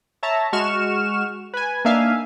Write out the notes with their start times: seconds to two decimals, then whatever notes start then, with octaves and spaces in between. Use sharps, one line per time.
0.23 C#5 E5 A5 A#5
0.53 G#3 F#4 C#6 F6 E7
1.54 B4 G#5
1.85 A#3 D4 D#4 E5 F5 G#5